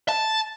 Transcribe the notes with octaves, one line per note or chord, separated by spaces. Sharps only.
A5